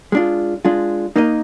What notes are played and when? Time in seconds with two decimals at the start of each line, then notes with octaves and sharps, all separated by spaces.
0.12 G#3 D4 F4
0.65 G#3 D4 F4
1.16 A#3 D#4 A#4 D#5